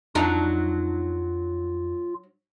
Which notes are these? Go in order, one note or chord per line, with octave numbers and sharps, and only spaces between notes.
F2 F#3 D4 D#4 F4